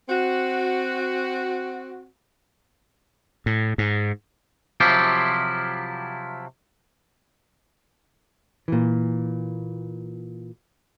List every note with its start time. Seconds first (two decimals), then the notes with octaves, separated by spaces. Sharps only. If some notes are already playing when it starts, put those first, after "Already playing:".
0.08 C4 F#4
3.46 A2
3.78 G#2
4.80 C3 F3 F#3 E4 F4 G4
8.68 A#2 E3